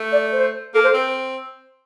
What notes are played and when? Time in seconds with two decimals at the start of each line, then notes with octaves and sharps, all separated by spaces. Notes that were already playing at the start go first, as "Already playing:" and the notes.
Already playing: A3
0.12 D5
0.32 C5
0.74 A#3 A4
0.84 C5
0.94 C4